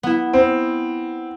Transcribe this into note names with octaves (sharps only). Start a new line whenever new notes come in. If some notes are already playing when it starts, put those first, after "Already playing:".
B3 E4
C4